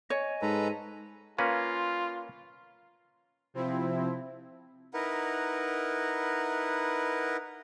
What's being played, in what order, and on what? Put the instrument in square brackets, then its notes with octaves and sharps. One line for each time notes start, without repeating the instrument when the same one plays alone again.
[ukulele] C#5 [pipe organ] D#5 G#5
[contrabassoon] G#2 [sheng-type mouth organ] A4 B4 A#5
[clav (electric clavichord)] A#3 C#4 B4 [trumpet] F4
[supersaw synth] C3 F3 C4 E4
[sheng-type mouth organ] D#4 E4 A#4 B4 F#5